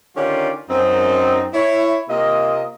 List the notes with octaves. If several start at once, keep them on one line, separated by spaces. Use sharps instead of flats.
D3 D#3 C#4 D4 F4 G4
F#2 C4 D#4
E4 C#5
C3 A#3 F4 D#5